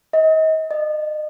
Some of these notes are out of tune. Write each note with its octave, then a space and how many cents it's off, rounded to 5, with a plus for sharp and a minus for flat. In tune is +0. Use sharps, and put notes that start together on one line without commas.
D#5 +35
D#5 -35